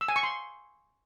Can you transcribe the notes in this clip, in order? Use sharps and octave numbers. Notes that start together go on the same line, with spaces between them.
E6
G#5
C#6
C6